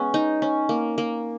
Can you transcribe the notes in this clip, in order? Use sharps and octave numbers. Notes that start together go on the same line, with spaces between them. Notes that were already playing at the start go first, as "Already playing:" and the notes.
Already playing: G#3 B3 C#4
D#4
C#4
A#3
A#3